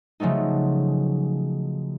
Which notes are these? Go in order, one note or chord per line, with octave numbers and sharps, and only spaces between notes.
C#3 F3 F#3 A3 D#4